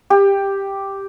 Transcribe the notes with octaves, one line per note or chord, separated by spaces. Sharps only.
G4